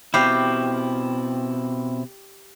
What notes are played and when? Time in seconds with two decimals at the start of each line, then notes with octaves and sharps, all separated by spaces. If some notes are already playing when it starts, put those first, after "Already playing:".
0.14 B2 C4 E4 G4 F5